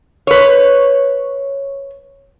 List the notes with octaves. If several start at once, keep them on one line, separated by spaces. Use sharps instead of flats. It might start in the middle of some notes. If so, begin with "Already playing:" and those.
B4 C#5